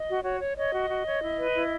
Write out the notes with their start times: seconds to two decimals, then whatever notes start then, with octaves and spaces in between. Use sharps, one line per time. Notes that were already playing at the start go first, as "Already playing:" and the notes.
Already playing: D#5
0.09 F#4
0.24 F#4 C#5
0.41 C#5
0.57 C#5 D#5
0.73 F#4
0.89 F#4
1.06 C#5
1.22 E4
1.38 B4
1.54 E4